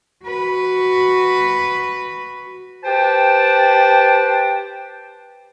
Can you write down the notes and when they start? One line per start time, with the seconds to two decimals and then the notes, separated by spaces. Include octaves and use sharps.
0.25 F#4 B4
2.84 G4 B4 C5 G5 A5